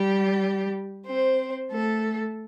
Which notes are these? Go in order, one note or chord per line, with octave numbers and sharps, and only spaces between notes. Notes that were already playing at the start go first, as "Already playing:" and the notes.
Already playing: G3 G4
C4 C5
A3 A4